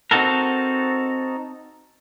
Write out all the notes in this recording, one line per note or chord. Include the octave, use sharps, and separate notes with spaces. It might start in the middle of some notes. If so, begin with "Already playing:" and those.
C4 D#4 F#4 A4 A#4